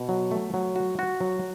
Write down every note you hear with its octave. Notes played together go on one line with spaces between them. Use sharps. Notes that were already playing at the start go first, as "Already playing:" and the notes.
Already playing: B2
F#3
A3
F#3
F#4
F#4
F#3